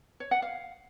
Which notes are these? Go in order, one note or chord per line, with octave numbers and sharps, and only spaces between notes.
C#5
F#5
F5